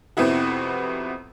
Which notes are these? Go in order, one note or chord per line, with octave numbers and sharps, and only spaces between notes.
F2 C3 B3 C4 E4 F#4